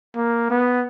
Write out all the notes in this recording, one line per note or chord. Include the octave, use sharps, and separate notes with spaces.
A#3
B3